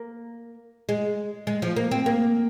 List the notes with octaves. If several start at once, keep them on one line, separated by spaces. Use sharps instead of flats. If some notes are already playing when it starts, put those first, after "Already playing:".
Already playing: A#3
G#3
G#3
F3
A#3
C4
A#3